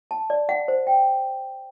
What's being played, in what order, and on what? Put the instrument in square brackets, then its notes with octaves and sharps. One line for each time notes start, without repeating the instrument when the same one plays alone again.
[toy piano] A5
D5
F#5
C5
G5